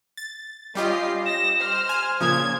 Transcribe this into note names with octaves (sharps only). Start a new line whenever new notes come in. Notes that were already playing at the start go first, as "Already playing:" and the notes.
A6
G3 C#4 F4 G4 D#5 C7
A#6 E7
C5 F6
G#5
A#2 C#3 F3 D#6 G#6